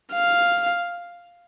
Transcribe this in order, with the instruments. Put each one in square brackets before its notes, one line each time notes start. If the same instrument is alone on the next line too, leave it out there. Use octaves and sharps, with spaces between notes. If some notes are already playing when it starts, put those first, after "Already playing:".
[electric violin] F5